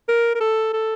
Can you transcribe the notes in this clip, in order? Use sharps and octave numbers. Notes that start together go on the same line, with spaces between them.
A#4
A#4
A4
A4